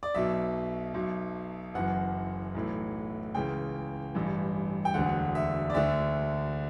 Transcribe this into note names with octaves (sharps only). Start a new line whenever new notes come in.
D5
B1 B2 E5
B1 B2
F#1 F#2 E3 F#5
B1 A2 E3
C#2 C#3 E3 G5
A1 G2 E3
G5
E1 D2 D3 F#5
E5
D5
D2 D3 E5